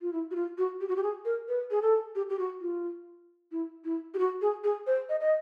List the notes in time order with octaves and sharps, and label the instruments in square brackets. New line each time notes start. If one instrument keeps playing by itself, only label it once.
[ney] F4
E4
F#4
F4
F#4
G4
F#4
G4
G#4
A#4
B4
G#4
A4
G4
G4
F#4
F4
E4
E4
G4
F#4
G#4
G#4
C5
D#5
D#5